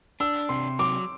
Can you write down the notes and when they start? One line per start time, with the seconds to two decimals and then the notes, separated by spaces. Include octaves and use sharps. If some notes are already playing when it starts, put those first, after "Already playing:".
0.20 D4 E6
0.49 C3 C6
0.79 F#3 D6